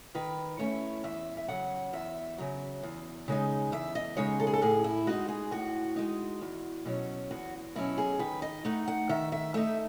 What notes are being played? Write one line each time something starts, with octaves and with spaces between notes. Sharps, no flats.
D#3 B4
A3 C#4 E4 C#5
E2 E5
E5
C#3 F#3 F#5
E2 E5
C#3 F#3
E2
C#3 G#3 D#4
E2 E5
D#5
C#3 G#3 D#4 C#5
A4
G#4
A4
A2 G#4
E4
G#3 D#4 F#4
G#4
A2 F#4
G#3 D#4
E2
B2 F#3 C#4
E2 F#4
B2 F#3 C#4 E4
G#4
D#3 B4
D#5
A3 D#4 F#5
F#5
D#3 E5
E5
A3 D#4 E5